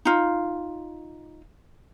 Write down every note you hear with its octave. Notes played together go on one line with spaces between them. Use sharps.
D#4 F4